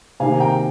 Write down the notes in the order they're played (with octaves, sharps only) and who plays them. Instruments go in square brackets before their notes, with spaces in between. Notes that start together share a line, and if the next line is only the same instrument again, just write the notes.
[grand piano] C3 D#3 A#3 F5 G#5
G5 A#5